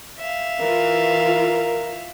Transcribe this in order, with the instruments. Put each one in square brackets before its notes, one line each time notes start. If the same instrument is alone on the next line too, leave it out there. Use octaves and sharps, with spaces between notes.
[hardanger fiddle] E5 F5
[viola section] E3 F4 [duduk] A#4